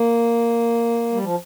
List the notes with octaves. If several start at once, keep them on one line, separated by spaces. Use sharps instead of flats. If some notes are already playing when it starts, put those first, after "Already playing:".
Already playing: A#3
G3
F3